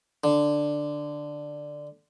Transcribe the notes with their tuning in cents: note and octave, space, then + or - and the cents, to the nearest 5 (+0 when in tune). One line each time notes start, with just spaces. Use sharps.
D3 +5